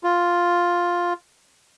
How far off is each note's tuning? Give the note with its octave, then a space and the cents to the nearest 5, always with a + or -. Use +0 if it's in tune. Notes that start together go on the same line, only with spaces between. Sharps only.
F4 +5